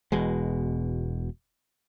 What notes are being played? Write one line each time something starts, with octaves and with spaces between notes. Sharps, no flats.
E1 E2 B2 G#3